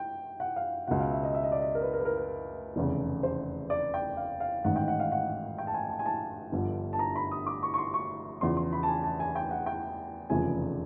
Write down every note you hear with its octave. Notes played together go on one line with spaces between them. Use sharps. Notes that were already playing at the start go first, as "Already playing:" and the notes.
Already playing: G5
F#5
F5
C#2 B2 F#5
F5
E5
D#5
E5
D#5
D5
D#5
A#4
B4
A#4
B4
A#4
B4
F1 E2 C#3
C5
D5
G5
F5
F5
A1 G#2 D#3 F#5
G5
F#5
F5
F#5
G5
A5
G#5
A5
G#5
A5
G1 G2 D3 F3
A5
A#5
B5
D#6
D6
C#6
C#6
C6
C#6
E2 C#3 F3 C6
C6
B5
A5
G#5
A5
G#5
G5
F#5
G5
F1 E2 C#3 F3 G#5